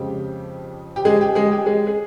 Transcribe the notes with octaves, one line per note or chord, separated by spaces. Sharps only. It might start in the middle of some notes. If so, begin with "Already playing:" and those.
Already playing: F2 C#3 F3 G#3 G4
G4
G#3 G#4
G4
G#3 G#4
G4
G#3 G#4
G#4